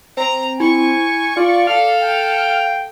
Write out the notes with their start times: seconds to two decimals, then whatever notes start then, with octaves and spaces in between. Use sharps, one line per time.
0.17 C4 A#5
0.60 E4 G#5 C#6
1.37 F4 D5
1.67 A4 F5 F6
2.03 G5